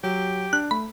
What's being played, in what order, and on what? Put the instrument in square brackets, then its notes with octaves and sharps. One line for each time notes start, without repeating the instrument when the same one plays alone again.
[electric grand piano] F#3 [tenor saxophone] G4
[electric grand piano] D4 [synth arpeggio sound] F#6
[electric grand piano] A3 [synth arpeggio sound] B5